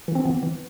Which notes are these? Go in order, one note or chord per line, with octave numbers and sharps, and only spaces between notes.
E3
C4
E3 B3
E3